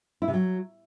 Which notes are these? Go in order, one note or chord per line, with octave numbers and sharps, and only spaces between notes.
E4
C3
F#3